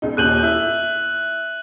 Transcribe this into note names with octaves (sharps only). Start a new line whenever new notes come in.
E1 C#2 D#4
D#1 D#2 F#6 G6 D#7 F#7
E4